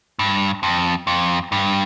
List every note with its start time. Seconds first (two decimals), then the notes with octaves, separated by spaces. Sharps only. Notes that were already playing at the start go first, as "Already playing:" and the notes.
0.19 G2
0.63 F2
1.07 F2
1.52 G2